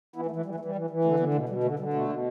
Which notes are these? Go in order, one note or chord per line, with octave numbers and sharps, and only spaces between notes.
E3 B3 E4
A3
E3
A3
E3 G3
A3
E3
G3
E3
E3
D3 A3
D3 G3 B3
B2 A3
B2 G3
D3 A3
D3 G3
B2 A3
B2